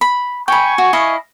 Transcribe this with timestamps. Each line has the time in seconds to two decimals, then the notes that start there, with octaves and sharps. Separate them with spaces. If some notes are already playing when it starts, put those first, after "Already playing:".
0.01 B5
0.48 G5 G#5 B5 C#6
0.78 F#4
0.93 E4 D#5 F5